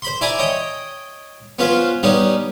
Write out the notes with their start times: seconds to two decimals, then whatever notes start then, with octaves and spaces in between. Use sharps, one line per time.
0.02 C5 B5 C6
0.21 E4 D5 G#5 A#5 B5
0.39 C#5 D#5 G5
1.59 B3 C#4 F4 B4 C5
2.03 G3 B3 C#4 D#4